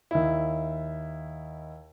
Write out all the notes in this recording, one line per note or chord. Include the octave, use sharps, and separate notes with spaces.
D#2 E4